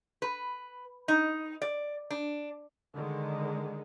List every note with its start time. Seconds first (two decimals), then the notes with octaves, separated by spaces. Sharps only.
0.22 B4
1.08 D#4
1.62 D5
2.10 D4
2.94 D3 D#3 G#3